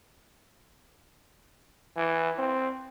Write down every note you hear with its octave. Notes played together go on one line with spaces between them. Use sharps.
E3
C4